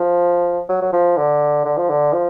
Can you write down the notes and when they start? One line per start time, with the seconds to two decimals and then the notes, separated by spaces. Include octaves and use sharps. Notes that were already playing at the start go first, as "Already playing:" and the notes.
Already playing: F3
0.69 F#3
0.81 F#3
0.93 F3
1.17 D3
1.65 D3
1.77 F3
1.89 D3
2.13 F3